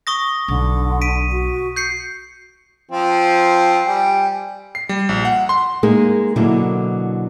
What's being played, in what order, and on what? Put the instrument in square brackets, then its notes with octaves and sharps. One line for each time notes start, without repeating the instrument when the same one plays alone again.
[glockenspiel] C#6 D#6 A#6
[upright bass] B1 [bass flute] D3
[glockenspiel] B6 D7 D#7
[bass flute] F#4
[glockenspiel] G6 C7 C#7
[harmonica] F3 C4 F4
G3 G5 G#5
[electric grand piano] C7
G3
A#1
F#5
C6
[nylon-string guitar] G#3 A#3 D#4 G#4
B2 D3 F#3 A#3 E4